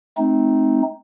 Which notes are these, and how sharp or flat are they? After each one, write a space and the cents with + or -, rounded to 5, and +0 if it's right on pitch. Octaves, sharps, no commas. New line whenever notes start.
A3 -40 C4 +0 D#4 +0